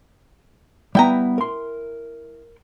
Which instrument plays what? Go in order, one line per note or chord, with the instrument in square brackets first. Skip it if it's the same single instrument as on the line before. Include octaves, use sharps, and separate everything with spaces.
[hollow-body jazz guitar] G3 B3 [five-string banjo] E4 G5 A#5
[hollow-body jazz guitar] A#4 C6